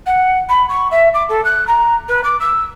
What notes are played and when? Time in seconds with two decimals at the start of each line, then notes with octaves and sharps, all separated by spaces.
0.06 F#5
0.49 B5
0.69 C#6
0.91 E5
1.14 D6
1.29 A4
1.44 F#6
1.67 A#5
2.08 B4
2.23 D6
2.40 E6